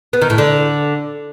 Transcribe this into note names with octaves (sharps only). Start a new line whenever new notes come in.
B3
D#3
A2
D3